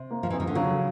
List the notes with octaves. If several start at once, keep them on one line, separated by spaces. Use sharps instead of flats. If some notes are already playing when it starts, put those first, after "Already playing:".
Already playing: C3
A#3
F3
F2 E3
D#3
D3
C#3 F#3